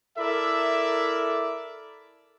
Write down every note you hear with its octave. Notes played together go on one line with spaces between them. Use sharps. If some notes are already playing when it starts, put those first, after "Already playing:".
E4 A4 A#4 D5 E5